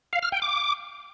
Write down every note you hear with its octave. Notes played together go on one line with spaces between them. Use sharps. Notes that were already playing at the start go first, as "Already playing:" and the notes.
F5
F6
G5
D6